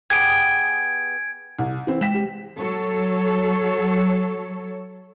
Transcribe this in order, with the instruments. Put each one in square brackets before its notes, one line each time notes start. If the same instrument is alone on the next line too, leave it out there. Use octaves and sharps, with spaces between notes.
[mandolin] B3 G4 G#4 [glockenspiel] G#6 D7
[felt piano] C2
E3 C4
[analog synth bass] G#3 [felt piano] G5 B6 E7
[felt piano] G4
[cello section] F#3 A4 C#5